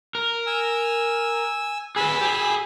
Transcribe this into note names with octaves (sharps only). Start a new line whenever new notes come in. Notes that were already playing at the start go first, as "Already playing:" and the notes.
A#4
G#5 E6
G#4 A4 B4 G#5 B5 E6
G4 G#4